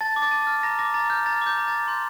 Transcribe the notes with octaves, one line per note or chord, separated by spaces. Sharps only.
A5 A6
D6
A6
A5
A6
F6
A#5 A#6
D6 A#6
A#5 A6
F6 G6
A#5 A6
D6 G6
A#5
A6
G6
C6 G6